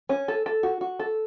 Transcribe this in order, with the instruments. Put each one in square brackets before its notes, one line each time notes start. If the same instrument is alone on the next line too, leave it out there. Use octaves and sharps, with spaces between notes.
[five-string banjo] C#4
A4
A4
F#4
F#4
A4